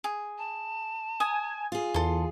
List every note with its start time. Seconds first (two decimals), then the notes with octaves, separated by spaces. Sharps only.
0.04 G#4
0.38 A5
1.20 G#5 D#6
1.72 F4 G#4
1.94 E2 A4 C6